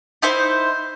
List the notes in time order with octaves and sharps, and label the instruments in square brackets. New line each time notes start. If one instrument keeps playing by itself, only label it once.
[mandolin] D#4 E4 C5